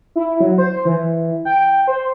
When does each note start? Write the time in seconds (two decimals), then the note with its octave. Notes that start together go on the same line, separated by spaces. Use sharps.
0.16 E4
0.40 F#3
0.58 C5
0.85 E3
1.45 G5
1.87 C5